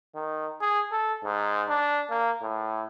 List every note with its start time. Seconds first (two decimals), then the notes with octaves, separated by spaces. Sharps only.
0.15 D#3
0.61 G#4
0.92 A4
1.24 G#2
1.69 D4
2.10 A#3
2.42 A2